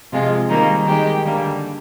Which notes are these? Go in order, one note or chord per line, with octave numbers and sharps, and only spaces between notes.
C3 F3 G#3 F4
D#3 G3 A#3 D#4
D#3 G#3 G4
D3 G3 A#3